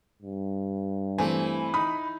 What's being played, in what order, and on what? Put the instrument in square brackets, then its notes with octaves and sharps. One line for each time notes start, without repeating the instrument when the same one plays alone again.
[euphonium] G2
[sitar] E3 [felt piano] A3 C4 [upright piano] G#5
[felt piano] D#4 D#6 [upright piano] B5